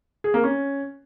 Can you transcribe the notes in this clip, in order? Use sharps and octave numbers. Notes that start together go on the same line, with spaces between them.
G#4
A#3
C#4